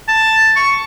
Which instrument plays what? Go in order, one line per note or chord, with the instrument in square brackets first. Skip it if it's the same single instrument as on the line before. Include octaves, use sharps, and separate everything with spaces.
[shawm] A5
C#6